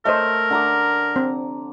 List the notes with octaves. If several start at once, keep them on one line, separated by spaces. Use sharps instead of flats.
A3 A#4 C5 C#5 D#5 E5
D3 A#5 D6
C4